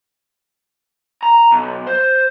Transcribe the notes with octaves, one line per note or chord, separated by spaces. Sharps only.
A#5
B1
C5